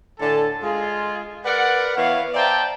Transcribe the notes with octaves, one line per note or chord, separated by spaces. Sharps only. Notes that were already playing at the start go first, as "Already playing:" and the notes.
A2 D3 A4 G#5 A5
G#3 F4 G#4
A#4 B4 D5 F#5
E3 B3 C#5 F5
C5 D5 E5 G5 A5 A#5